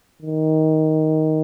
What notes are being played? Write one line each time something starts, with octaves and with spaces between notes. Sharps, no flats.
D#3